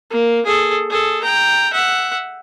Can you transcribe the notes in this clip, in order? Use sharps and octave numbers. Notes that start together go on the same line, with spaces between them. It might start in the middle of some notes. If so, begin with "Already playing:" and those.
A#3
G#4 A4
G#4 A4
G5 A#5
E5 F#5